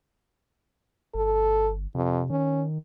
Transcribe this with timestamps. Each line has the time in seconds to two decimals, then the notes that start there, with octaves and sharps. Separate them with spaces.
1.14 G1 A4
1.95 F2 C3
2.30 D#3 C#4